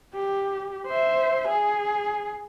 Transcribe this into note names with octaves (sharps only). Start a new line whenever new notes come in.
G4
C5 E5
G#4